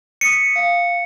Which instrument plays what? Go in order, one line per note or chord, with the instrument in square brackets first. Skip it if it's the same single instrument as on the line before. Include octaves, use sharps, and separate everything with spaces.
[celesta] D#6 B6 D#7 [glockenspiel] C#7
[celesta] F5